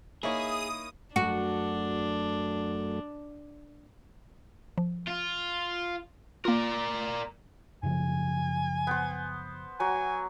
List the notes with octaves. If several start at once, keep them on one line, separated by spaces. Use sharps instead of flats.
A#3 D#4 E4 G#4 C#5 D#6
F#2 A3 D4 F#4
F3
F4
A#3 F4 A#4 D5
F#2 C#3 F3 G#5
B3 C5
F#3 G#5